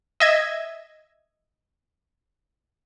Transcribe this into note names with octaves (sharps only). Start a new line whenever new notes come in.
D#5 E5 G#6